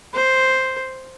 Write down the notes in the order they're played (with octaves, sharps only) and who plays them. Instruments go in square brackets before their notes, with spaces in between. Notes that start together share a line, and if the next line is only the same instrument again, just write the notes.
[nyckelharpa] C5